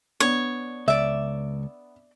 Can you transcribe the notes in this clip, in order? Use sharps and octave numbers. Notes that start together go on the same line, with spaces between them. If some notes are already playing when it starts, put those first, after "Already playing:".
B3 D4 C#5
C#2 D5 E5